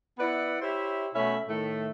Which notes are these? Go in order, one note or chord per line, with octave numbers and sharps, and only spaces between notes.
B3 E4 B4 D5 F#5
E4 G4 C5 C#5 E5
B2 A3 C#4 E5 B5
A2 D#3 A3